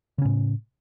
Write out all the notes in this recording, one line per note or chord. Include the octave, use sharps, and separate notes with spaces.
A2 C#3 C#4